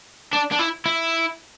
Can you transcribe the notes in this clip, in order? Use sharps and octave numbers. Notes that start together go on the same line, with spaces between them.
D4
D4
E4
E4